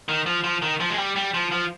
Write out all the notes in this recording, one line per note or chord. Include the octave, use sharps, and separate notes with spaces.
D#3
F3
F3
D#3
F3
G#3
G3
G3
F3
F3